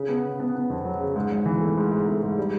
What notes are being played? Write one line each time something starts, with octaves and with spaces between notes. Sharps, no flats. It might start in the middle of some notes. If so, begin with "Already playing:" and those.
Already playing: C#3
B3
C#3
B3
B3
F2
F#3
C#3
G#2
G#1
E3
A3
G#2
G#2
A3
G#2
G3